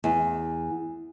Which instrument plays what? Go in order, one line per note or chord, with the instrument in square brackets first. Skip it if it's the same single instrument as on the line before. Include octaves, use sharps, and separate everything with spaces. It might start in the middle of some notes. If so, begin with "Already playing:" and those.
[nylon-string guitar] E2